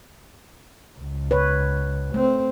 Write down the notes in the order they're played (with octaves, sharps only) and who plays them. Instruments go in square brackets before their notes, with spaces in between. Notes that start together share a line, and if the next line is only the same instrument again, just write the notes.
[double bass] C#2
[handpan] B4 C#5
[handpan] A3 [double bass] C4